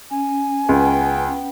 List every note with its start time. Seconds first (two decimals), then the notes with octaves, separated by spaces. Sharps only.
0.11 C#4 G#5
0.69 C#2 B3 G5